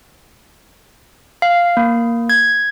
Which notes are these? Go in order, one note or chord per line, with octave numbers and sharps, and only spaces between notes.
F5
A#3
G#6